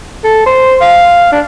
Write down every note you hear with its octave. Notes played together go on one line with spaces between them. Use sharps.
A4
C5
F5
D4